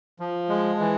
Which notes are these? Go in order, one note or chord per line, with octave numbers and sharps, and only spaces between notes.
F3
G#3
E3